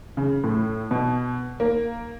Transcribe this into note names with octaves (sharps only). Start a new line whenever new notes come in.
C#3
A2
B2
A#3